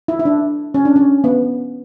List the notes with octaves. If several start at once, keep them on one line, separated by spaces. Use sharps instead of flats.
E4
E4
D4
C#4
D4
C#4
B3